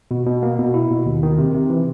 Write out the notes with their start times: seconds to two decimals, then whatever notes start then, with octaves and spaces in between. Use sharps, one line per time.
0.11 B2
0.26 B2
0.43 A#3
0.59 B2
0.74 E4
0.90 B2
1.06 D#2
1.23 D#3
1.38 C3
1.54 C3
1.70 E3